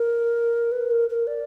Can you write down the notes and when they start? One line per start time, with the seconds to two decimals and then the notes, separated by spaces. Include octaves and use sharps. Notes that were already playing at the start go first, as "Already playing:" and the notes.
Already playing: A#4
0.72 B4
0.91 A#4
1.10 A#4
1.27 D5